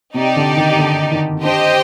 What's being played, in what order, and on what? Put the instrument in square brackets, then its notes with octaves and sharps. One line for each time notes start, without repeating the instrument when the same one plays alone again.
[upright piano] C3 [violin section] D#4 G4 D5
[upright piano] D3
D#3
D3
D#3
[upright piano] D4 [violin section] G4 C5 D#5 G5